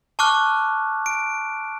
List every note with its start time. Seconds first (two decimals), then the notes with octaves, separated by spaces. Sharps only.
0.19 A5 C#6 D6 F6 F#6
1.06 D7